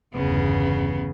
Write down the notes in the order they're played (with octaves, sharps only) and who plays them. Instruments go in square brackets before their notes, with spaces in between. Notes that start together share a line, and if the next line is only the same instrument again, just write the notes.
[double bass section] G1 E2 G2 [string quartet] C#3 B3